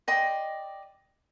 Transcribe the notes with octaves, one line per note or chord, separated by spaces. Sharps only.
D5 D#5 G5 C6